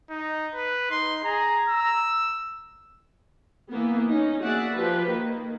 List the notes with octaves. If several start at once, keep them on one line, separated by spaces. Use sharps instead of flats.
D#4
B4
D#4 C6
G#4 A#5
E6
E3 A#3 B3
C#4 D#4
A#3 F#4 G#4 D5 E5 F#5
F3 G4 B4
D#3 A#3